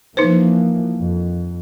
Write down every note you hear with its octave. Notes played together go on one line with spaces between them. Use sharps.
E3 F3 A#3 D#4 B4 C5
F2